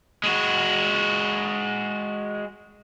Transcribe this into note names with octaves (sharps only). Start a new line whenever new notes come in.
G#3 F#4